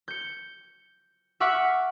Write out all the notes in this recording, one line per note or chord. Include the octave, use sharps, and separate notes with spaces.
G6 C#7
E5 F#5 C#6 D6 F6 B6